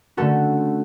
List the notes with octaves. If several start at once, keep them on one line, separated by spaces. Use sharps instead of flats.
D3 A3 C#4 F#4 A4